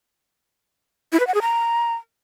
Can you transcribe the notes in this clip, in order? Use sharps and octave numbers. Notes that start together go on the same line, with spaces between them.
E4
B4
F#5
G#4
A#5